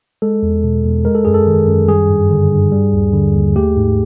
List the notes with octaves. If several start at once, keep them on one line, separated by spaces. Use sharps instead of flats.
G#3 A4
E2
B2
E2
G#3 A#4
A4
F#2 G#4
A4
D#3
F#2
G3 G#4
G2
D3
G2
G3
D#2
D3
D#2
A3 G4
G#2